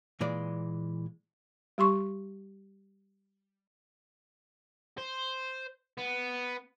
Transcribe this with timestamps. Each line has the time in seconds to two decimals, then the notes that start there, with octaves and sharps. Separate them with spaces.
0.21 A#2 E3 G#3 D5
1.78 G3 G4 C6 C#6
4.97 C5
5.98 B3